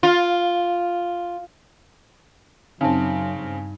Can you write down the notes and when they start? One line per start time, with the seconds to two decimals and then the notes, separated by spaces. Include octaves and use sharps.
0.03 F4
2.81 F#2 C#3 C4 D#4 A5
3.39 G2